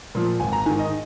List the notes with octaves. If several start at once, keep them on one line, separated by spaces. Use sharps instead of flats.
A#2 F3
G#1 G#5
A#5
G#2 D#3 G#5
D#5